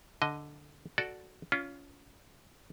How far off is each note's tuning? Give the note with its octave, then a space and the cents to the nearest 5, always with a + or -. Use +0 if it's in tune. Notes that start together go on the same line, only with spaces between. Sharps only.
D3 +0 D#5 +0
F#4 +0 A4 +0 D5 +0
C#4 +30 F4 +0